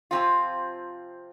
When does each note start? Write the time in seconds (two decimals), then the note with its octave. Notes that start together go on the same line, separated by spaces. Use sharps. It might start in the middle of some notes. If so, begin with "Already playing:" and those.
0.11 C3 F3 C4 F4